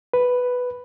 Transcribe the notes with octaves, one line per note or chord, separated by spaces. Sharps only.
B4